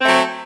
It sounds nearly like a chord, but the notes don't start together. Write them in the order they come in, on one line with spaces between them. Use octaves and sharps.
C4 A3 F#3